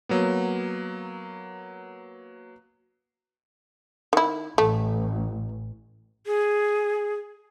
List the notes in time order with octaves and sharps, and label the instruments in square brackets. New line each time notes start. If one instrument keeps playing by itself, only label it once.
[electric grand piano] F#3 A#3 B3
[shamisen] D#3 E4
[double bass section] A1 [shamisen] A3
[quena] G#4